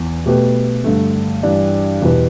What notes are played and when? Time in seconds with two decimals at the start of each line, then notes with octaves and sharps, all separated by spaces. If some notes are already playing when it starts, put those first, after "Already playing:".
Already playing: E2
0.25 B2 A3 G4 B4
0.84 G2 D3 A3
1.43 G2 E3 G3 D4
2.02 E2 B2 G3 E4 B4